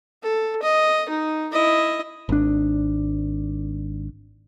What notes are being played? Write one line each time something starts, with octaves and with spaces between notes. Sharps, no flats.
A4
D#5
D#4
E4 D#5
G#1 D4